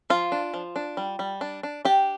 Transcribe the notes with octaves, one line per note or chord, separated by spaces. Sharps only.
F3 F4
D4
F3
D4
G3
G3
D4
D4
D4 G4